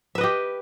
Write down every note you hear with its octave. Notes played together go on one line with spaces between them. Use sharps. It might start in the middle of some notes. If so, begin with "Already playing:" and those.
G4 B4 D#5 E5